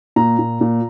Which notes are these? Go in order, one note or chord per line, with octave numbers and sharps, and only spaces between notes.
A#2 A#5
A#2
A#2